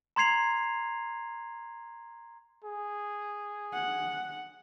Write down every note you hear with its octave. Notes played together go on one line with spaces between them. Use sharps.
A#5 C6 G#6 C7 F7
G#4
F#5